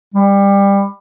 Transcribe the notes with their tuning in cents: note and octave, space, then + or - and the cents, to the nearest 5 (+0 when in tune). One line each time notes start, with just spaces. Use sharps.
G3 +20